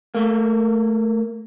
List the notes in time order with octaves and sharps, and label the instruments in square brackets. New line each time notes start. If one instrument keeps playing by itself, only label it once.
[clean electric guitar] A3 A#3